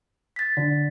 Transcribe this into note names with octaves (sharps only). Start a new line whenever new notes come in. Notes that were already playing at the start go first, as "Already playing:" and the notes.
A6 B6
D3